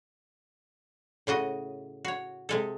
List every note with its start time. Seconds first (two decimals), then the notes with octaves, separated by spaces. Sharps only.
1.27 A2 C#3 F#4 D#5
2.05 F#4 C#5
2.49 C3 G#3 A4